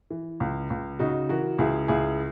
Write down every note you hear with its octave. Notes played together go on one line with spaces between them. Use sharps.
E3
C#2
C#2
C#3 D#4 F#4
E3 F#4 A#4
C#2 E4 G#4
C#2 E4 G#4